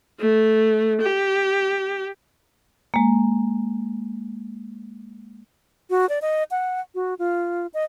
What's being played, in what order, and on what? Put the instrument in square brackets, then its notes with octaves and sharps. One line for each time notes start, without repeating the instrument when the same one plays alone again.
[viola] A3
G4
[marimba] G#3 A#3
[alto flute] F#4
D5
D#5
F#5
F#4
F4
D#5